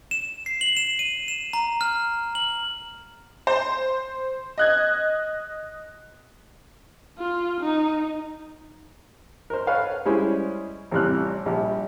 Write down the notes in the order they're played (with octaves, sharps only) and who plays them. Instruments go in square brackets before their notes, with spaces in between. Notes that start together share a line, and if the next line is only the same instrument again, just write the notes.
[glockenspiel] E7
C7
F#7
E7
D#7
E7
A#5
F6
F#7
[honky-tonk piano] C5
D#5 F#6 G#6
[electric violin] F4
D#4
[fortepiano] A#4 C5
A4 B4 C#5 F5
G3 G#3 C#4 E4 G#4 C5
A1 F2 C3 G3 F6 F#6
A#1 G3